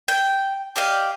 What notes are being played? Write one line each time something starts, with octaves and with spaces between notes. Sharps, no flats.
G5
G4 D5 D#5 F5